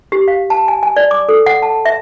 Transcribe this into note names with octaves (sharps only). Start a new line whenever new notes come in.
G4
F5
A5
G#5
G#5
D5
D6
A4
F#5
A5
E5